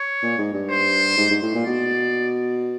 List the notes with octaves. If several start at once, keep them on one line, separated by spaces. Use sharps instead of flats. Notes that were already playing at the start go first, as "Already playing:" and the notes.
Already playing: C#5
A#2
G#2
G2
C5
G#2
G#2
A2
A#2
B2 D5